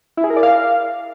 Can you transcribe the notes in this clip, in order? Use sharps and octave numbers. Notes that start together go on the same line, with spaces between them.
E4
G#4
A#4
D5
F5